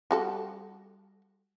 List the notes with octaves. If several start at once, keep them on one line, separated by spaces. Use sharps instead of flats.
G3 F#4 A4